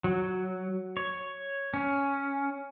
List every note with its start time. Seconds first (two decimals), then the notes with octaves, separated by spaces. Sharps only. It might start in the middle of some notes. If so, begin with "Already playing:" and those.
0.04 F#3
0.97 C#5
1.74 C#4